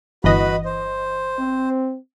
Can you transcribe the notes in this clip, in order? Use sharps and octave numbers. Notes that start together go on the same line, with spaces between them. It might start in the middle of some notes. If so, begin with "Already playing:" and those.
G1 E3 F#4 B4 D#5 B5
C5
C4